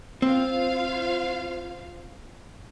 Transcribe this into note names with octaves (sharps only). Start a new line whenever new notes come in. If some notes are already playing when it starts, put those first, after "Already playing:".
C4 F4 C5 F5